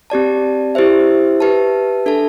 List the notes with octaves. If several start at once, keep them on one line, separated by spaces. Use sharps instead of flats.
C4 G4 D5 A5
E4 G4 C5 E5
G4 B4 E5 A5
D4 A4 E5 A5